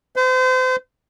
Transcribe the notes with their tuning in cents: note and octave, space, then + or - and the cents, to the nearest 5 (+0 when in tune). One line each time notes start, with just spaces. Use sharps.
C5 -35